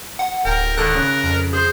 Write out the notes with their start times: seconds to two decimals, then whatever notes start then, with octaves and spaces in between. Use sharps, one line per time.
0.19 F#5
0.45 D1 A#4 G5
0.78 G#1 A4 A#4 F#6
0.95 C#3
1.24 F2
1.53 G#4 C5